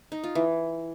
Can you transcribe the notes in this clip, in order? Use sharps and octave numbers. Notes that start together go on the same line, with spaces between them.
D#4
F4
E3